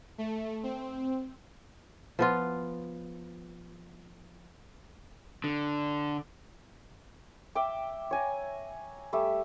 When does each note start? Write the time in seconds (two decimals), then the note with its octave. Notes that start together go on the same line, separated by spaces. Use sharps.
0.18 A3
0.63 C4
2.19 F3 B3 F4
5.44 D3
7.55 E5 G5 D6
8.11 C#5 G#5 A#5
9.13 G3 A3 G4 E5